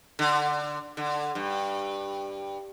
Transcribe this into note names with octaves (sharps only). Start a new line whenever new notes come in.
D3
D3
G2